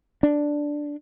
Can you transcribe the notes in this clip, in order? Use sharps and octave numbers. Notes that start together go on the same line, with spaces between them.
D4